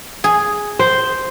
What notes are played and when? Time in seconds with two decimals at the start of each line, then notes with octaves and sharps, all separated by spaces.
0.24 G#4
0.79 C5